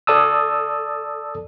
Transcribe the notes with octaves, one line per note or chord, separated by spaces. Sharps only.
A4 D5 A5 D#6 E6